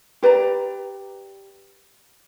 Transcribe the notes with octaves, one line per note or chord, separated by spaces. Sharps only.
G4 B4 D5 A#5